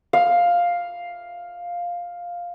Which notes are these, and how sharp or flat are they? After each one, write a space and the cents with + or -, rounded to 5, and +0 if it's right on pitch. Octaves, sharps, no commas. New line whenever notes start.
F5 +5